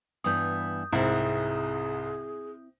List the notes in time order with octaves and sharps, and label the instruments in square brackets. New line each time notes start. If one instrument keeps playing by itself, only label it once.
[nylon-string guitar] G2 E3 B3 [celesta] D#6 G6
[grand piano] C2 G#2 [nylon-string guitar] C4 E4 [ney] G#4